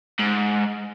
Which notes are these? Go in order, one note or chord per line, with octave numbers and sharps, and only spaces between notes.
G#2